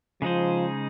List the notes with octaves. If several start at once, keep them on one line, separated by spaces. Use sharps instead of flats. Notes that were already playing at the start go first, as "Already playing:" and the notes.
C#3 F3 G#3 D#4 G#4 C5